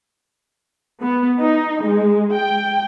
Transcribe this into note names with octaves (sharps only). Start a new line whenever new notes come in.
B3
D#4
G#3
G5